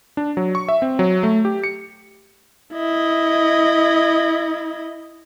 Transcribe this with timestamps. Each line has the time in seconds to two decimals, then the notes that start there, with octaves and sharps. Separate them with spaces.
0.17 D4
0.37 F#3
0.55 C#6
0.68 E5
0.82 C4
0.99 F#3
1.23 A3
1.45 G4
1.64 C#7
2.73 E4 D#5